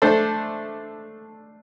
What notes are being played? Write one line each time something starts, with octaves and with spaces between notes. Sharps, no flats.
A3 D4 A4 C5